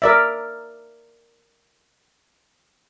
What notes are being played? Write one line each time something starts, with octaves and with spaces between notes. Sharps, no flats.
A#4 D5 E5